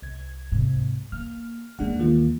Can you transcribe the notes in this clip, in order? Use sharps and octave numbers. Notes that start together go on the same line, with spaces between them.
C2 G#6
G#2 C3
A#3 F6
D#2 E3 G#3 D4 F#5
D#3 A#3 F4